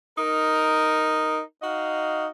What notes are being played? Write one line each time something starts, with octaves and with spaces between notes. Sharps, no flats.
D#4 A#4
D#4 F#4 D#5 F5